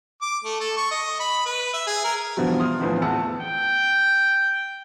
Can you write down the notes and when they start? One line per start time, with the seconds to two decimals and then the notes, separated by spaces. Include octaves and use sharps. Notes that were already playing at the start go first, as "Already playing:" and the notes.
0.22 D6
0.44 A3
0.61 A4
0.77 C#6
0.91 D#5
1.20 B5
1.46 B4
1.73 E5
1.87 G#4
2.04 A#4
2.37 G2 B2 E3 F3 F#4
2.59 C6 D#6 F6
2.80 D2 A2 E3 F3 B3 C4
3.02 E2 F#5 A5 E6 C#7
3.42 G5